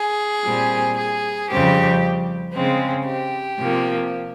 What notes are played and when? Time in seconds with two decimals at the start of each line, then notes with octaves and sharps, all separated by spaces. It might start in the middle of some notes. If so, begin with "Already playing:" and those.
Already playing: G#4
0.43 A#2 G3 C4
0.96 G#4
1.48 F2 C#3 G3 C4 G4
2.53 C#3 G#3 C4
3.05 G4
3.57 C3 F3 A#3